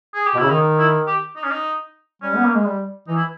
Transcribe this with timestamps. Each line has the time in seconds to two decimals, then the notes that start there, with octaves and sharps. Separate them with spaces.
0.15 G#4
0.26 G4
0.34 B2
0.38 C#3 E4
0.50 D#3 D#4
0.79 E4
1.07 G4
1.36 D#4
1.44 C#4
1.51 D#4
2.22 G3 C#4
2.37 B3
2.46 A#3
2.55 G#3
2.65 G3
3.08 E3 D#4
3.15 E4